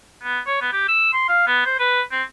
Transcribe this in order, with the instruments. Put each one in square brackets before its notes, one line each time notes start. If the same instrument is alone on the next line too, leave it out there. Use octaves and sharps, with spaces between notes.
[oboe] B3
C#5
B3
G4
E6
C6
F5
B3
C5
B4
C4